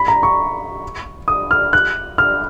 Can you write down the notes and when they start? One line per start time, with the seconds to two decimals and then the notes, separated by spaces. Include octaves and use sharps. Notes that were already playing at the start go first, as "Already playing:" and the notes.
Already playing: B5
0.08 A#5
0.23 C#6
1.28 D#6
1.51 F6
1.73 F#6
2.18 F6